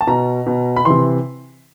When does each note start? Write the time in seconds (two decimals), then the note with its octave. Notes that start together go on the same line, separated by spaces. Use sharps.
0.01 A5
0.07 B2 A#5
0.46 B2
0.76 B5
0.85 C3 E3 C6